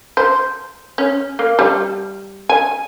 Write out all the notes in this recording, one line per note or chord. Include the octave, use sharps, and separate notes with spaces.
C5
C#4
A#3
G3
G#5